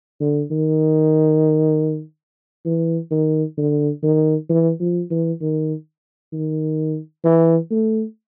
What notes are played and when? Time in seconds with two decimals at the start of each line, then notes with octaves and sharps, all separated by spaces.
0.20 D3
0.51 D#3
2.66 E3
3.11 D#3
3.57 D3
4.03 D#3
4.49 E3
4.80 F3
5.11 E3
5.41 D#3
6.33 D#3
7.24 E3
7.71 A3